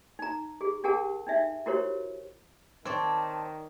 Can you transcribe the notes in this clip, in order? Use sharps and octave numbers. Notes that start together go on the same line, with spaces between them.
D#4 A#5
G4 G#4
D4 G4 G#4 A#4 F#5 A5
D4 D#4 E5 F5
E4 F#4 G4 A#4 C5 C#5
D#3 C4 C#5 D5 A5